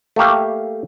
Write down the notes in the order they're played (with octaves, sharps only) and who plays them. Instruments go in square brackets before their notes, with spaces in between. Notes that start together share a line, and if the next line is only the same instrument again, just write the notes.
[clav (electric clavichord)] A3 A#3 G4 F5